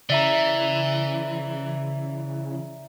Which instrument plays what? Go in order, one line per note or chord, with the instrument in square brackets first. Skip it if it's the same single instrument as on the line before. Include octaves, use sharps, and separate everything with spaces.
[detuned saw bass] C#3 [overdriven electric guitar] E3 [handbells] D5 E5 A#5